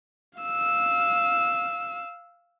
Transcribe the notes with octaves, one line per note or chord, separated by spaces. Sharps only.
F5 E6